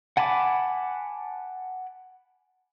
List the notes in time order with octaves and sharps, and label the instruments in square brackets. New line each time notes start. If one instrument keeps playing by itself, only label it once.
[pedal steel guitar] F#5 G#5 A5 B5 D6